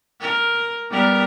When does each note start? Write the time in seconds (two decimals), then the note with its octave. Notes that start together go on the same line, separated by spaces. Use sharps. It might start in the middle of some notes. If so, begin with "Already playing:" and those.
0.21 A#4
0.90 G3 B3 A#4